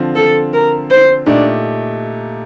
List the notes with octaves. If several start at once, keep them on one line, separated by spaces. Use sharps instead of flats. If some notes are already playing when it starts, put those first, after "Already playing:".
Already playing: D3 F3 C4 F4
A4
A#4
C5
A#2 A3 D4 D#4 G4